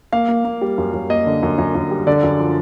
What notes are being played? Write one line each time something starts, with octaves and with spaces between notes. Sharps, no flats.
A#3 F5
A#3
A#3
G3
F#2
F#2
A#3 D#5
D3
F#2
F#2
F#2
G3
D3 D5
F#2
F3